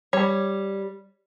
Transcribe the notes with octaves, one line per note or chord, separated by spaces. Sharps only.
G3 C#5